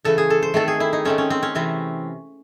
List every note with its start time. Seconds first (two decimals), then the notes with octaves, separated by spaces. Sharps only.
0.04 C#3 E3 A3 A4
0.18 G#4
0.30 A4
0.43 C5
0.54 D#3 A3 C4 A4
0.68 G#4
0.80 E4
0.93 D#4
1.05 D#3 A3 C4 C#4
1.18 C#4
1.30 C4
1.43 C#4
1.55 C3 E3 C4